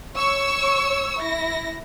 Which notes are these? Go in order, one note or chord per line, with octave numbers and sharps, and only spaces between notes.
C#5 C#6 E6
E4 A#6